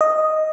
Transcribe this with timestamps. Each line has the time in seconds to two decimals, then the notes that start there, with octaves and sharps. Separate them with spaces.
0.01 D#5